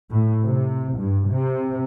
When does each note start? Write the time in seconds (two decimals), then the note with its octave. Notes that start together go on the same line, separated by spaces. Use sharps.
0.10 A2
0.45 C3
0.97 G2
1.30 C3